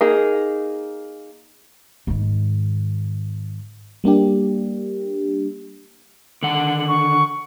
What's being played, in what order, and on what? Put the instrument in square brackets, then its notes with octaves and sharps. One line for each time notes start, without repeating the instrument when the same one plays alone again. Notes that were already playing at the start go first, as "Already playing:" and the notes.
[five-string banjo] A#3 D#4 G#4
[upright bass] G#2 D#3
[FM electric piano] G3 A#3 D4 G4
[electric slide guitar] D3 D#3 F#5 [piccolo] F#7
[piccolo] C#6